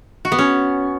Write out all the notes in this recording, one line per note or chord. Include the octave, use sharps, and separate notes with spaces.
F#4
B3
C#4